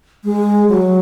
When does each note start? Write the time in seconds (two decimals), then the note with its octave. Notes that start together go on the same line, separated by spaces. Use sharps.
0.24 G#3
0.68 F#3